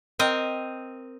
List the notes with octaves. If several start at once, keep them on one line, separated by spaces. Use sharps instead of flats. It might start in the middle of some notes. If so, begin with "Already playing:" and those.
C4 A#4 D#5